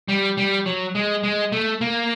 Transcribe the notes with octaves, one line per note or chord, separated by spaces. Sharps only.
G3
G3
F#3
G#3
G#3
A3
A#3